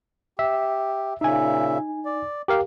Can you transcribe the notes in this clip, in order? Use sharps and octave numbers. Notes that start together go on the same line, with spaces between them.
G4 E5
A#2 C#3 D#4 E5 G#5
D5
G4 A#4 F5